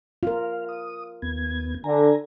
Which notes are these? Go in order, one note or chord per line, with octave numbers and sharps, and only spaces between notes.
F4 A#4 F5
D#6
D#2 B3 G#6
D3 G#5 A#5